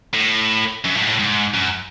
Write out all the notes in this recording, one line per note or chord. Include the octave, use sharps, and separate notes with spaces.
A2
F#2
A2
G#2
A2
G#2
F#2